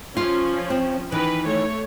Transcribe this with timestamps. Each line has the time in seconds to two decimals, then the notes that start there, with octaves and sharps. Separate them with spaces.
0.17 F3 C#4 F4
0.70 C4
1.12 D#3 E3 B4
1.46 A3 C#5